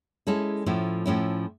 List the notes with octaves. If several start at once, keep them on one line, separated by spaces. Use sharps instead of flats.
G#3 C#4 E4 A4
A2 F3 A3 C#4 E4
A2 F3 A3 C#4 E4